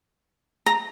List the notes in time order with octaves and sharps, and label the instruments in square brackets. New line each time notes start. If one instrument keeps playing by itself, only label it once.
[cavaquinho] A#5